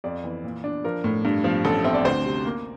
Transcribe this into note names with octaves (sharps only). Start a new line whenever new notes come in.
F2 D5
E3
A#2
D4
F3 A#4
A2
G2
F3
A1 A4
C4 E5
D5
D2 C5
C3
A#3